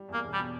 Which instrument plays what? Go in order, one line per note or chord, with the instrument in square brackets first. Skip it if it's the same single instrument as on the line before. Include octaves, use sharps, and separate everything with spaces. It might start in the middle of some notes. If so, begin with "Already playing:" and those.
Already playing: [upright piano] G3
[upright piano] E2 [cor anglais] A#3
[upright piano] E1
[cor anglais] G3
[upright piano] B2